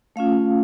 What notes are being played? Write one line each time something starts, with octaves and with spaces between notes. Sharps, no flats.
A3 C#4 F4 F5